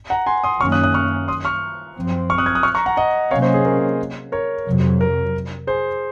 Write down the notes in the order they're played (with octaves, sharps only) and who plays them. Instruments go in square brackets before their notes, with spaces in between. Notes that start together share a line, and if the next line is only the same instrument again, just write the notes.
[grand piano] F#5 A#5
G#5 C6
C6 D#6
[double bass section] F#2 D#3 A#3 C#4 [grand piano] C#6 F6
[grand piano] D#6 F#6
D#6 F#6
C#6 F6
C6 D#6
C#6 F6
[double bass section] F#2 F3 C4
[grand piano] C#6 F6
D#6 F#6
F6 G#6
D#6 F#6
C#6 F6
A#5 C#6
F#5 A#5
D#5 F#5
[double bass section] C3 F#3 A#3 C#4 [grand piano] C#5 F5
[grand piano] C5 D#5
G#4
A#4
A#4 C#5
[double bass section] F2 C3 F#3
[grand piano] A#4
G#4 C5